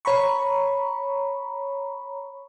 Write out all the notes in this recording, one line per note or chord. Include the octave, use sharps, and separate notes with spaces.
C#5 A#5 B5 C#6